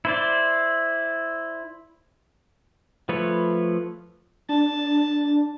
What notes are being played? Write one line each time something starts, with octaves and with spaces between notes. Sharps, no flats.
E4 C5 D5
F3 A3 B4 C#5
D4 A5